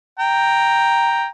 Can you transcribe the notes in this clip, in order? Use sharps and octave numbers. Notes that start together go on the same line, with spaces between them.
G5 A#5